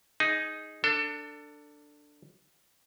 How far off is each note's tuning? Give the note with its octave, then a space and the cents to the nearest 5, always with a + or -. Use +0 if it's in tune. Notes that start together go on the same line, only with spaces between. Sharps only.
D#4 +0 G#4 +0
D4 +0 A4 +25